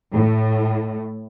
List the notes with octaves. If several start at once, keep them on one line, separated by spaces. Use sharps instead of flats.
A2